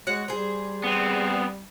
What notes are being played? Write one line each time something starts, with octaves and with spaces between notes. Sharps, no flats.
G#3 F#4 C#5 F#5
G3 G#4 C5
B3 C4